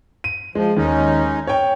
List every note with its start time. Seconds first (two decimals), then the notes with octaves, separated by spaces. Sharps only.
0.24 D#7
0.55 F3 G#3
0.77 D#2 G#3 C#4 D#4
1.47 C#5 G5